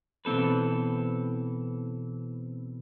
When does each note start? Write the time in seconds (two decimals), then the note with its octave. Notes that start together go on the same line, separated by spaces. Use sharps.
0.25 B2 E3 C4 A4 B4